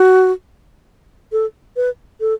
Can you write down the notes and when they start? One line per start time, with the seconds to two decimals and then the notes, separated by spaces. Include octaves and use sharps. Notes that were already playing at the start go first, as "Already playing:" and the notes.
Already playing: F#4
1.32 A4
1.76 B4
2.21 A4